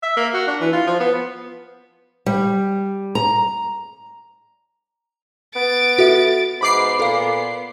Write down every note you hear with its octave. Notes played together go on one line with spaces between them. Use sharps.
E5
A#3
F#4
D4
E3
F4
F3
B3
G3
A#5
B3 A6 D7
F#4 A4 E5
G#2 B3 B5 D6 C7
A#2 A4 F5